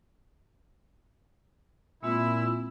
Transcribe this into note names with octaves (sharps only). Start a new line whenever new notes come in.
A#2 G#3 C4 E4 F4 E6